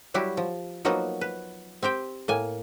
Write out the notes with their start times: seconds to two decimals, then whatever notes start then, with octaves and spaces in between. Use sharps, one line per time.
0.14 F#3 G3 E4 F#4 G4
0.37 F3
0.85 F3 F#3 A#3 B3 D#4 F#4
1.21 B4
1.83 C4 G4 C5 G5
2.28 A2 A#3 G#5